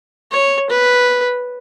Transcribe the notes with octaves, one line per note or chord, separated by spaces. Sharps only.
C#5
B4